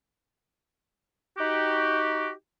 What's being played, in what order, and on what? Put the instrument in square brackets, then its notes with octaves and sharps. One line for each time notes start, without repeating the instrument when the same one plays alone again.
[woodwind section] D#4 F#4 G4